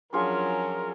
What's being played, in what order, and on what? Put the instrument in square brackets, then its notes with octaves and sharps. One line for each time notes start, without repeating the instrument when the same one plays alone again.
[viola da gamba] F3 F#3 C#4 [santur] D4 F4 G#4 [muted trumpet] A#4